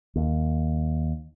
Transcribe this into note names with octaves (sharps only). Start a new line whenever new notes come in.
D#2